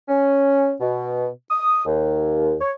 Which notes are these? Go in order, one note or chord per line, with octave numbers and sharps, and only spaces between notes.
C#4
B2
D#6
D#2
C#5